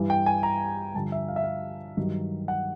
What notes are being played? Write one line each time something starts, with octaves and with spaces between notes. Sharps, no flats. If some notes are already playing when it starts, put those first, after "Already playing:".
Already playing: G2 E3
G5
G#5
A#5
G2 D3 F3 A5
E5
F5
E5
F5
G2 D#3 F#3
F#5